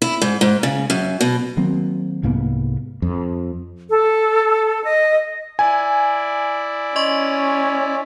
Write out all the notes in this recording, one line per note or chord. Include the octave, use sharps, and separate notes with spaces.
E4
G#2
G#2
C#3
F#2
B2
D#3 F#3 A#3 C4
C2 G#2 A#3 B3
F2
A4
D#5
E4 D5 G#5
C#4 D#5 C6 C#6